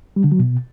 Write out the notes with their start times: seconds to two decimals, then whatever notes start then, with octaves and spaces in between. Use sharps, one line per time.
0.16 G3
0.24 D3
0.32 F#3
0.39 B2